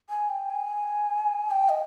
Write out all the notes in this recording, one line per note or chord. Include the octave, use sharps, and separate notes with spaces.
G#5
G5
G#5
G5
D#5